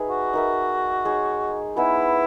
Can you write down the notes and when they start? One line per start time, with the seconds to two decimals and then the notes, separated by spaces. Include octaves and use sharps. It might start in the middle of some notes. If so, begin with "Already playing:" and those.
Already playing: D#4 G#4 B4 E5
0.10 F#4
0.33 D#4 A#4 E5
1.05 G#3 D#4 G#4 C#5
1.76 B3 D#4 E4 G#4 B4